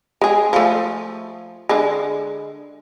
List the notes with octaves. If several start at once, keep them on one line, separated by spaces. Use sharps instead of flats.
G#3 G#4
F3 A3
D3 G#3